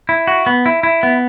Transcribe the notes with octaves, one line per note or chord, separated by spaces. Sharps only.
E4
F#4
B3
E4
E4
B3